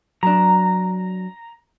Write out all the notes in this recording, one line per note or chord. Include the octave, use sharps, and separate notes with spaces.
F#3 D4 A#5